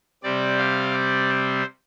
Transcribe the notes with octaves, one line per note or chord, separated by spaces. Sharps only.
C3 G3 C4 D5
F5
D5
C5